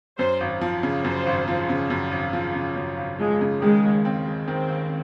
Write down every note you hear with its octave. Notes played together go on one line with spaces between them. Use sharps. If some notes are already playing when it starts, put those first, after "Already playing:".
F#2 C5
G#1
F3
C#3
F#2 C5
G#1
F3
C#3
F#2
G#1
F3
C#3
F#2
G#1
F3 G#3
C#3
D#3 G#3
D#2
C4
G#3
D#3 C4
D#2